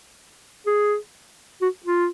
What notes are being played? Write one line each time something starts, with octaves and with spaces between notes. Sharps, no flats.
G#4
F#4
F4